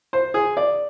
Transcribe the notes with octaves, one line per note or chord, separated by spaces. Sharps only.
C5
G#4
D5